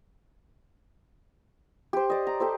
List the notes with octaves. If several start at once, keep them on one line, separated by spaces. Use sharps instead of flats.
G4 C5
D5 D#5
A#5
G4 A4 C5